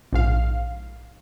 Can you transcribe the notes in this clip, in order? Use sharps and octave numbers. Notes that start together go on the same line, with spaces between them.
A#1 G#2 F5